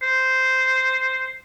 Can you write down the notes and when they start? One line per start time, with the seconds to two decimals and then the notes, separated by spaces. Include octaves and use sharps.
0.03 C5